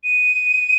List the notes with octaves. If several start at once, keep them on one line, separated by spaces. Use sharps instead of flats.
D#7